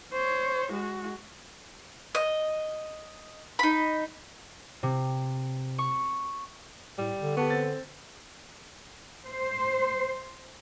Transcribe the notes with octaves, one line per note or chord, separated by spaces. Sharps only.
C5 C#5
G#3 F#4
D#5
D#4 B5
C3
C#6
A2 G3
D3
B3 G4 A5 C#6
C4 A6
C5